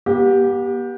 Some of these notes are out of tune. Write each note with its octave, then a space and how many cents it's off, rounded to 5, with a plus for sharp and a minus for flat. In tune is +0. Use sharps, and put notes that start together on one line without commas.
B3 -40 G4 +0